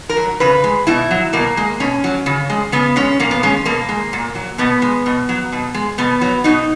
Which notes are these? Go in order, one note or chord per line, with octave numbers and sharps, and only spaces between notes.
A#4
F#3
C#3 B4
G#3
B2 E4
F#3
B2 A#3
G#3
B2 C#4
F#3
C#3
G#3
C#3 B3
G#3 C#4
A#2 A#3
B3
G#3 C#4
B2 A#3
G#3
A#2
F#3
B2 B3
G#3
B2
F#3
B2
G#3
B2 B3
F#3
B2 D#4